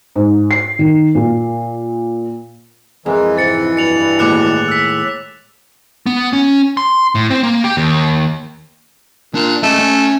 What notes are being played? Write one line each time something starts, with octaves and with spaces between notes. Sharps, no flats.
G#2
C7
D#3
A#2
F2 E3 G#3 A#4
G#2 C3 A6 C#7
G2 B2 C#7 F7 F#7
D#2 A2 G#3 D6 F#6 C#7
E6 B6
B3
C#4
C6
A2
C4
A#3
G4
D#2
A#2 D4
A3 C#4 D#5
C#4